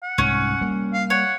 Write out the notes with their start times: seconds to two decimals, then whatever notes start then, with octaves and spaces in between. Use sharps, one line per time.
0.03 F#5
0.18 C2 G#2 C#4
0.61 G3 A#3
0.93 F5
1.10 C#5 F#5